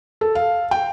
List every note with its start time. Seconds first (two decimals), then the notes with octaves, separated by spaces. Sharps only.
0.21 A4
0.35 F5
0.71 G5